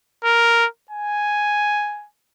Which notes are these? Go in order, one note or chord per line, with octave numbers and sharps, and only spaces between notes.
A#4
G#5